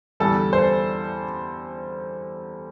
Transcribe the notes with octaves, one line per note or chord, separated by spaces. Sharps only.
E2 D3 G3 A4
C5